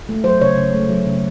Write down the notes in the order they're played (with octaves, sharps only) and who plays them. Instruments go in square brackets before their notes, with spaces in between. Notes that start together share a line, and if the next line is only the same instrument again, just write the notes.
[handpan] A3
F#3 C5
C#3 C#5
C#3
A3
F#3
C#3